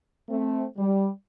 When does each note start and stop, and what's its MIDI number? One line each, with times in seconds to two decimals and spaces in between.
0.29 0.66 57
0.29 0.66 60
0.77 1.09 55